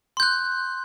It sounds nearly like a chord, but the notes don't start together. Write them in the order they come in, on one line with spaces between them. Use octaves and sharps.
C6 G6 F#6